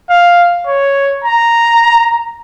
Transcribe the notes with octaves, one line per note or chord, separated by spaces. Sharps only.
F5
C#5
A#5